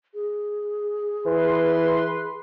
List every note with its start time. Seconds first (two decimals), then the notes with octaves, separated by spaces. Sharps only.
0.14 G#4
1.26 E3 B4 C6